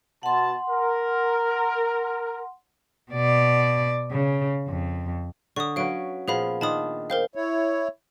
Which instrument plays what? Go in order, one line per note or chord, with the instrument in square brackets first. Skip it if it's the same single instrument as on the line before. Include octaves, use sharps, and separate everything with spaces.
[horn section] B2 A5 [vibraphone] F#5 C6
[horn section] A#4
[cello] B2 D5
C#3
F2
[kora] D3 [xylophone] C#6 D#6
[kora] F#3 C#4 B4 [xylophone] F5 D7
[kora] A#2 F3 B3 [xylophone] G#4 F5 B5
[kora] D#3 D4 F4 [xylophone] A5 B5 D#6
[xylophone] A#4 C5 F5 [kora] G5
[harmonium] E4 C#5